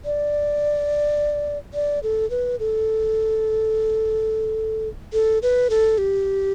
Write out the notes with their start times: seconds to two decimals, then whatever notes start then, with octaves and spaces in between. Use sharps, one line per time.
0.05 D5
1.74 D5
2.03 A4
2.30 B4
2.59 A4
5.13 A4
5.42 B4
5.70 A4
5.98 G4